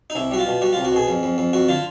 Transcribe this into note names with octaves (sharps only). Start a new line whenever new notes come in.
D#4
C2 E4
G3 F#4
F4
B2
G3 F#4
C2 F4
F#4
B2 G#4
F2
F2
F2
F2 F#4
D3 F4